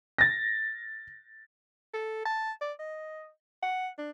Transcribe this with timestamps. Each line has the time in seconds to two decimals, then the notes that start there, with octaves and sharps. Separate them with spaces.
0.18 A6 A#6
1.94 A4
2.25 A5
2.61 D5
2.79 D#5
3.63 F#5
3.98 D4